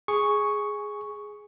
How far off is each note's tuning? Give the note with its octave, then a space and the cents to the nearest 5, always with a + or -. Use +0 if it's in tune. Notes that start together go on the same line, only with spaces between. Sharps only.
G#4 +0 C#6 +0